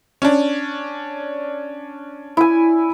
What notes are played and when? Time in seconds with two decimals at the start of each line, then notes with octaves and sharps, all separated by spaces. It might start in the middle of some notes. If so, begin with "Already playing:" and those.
0.22 C#4 D4
2.37 E4 G#5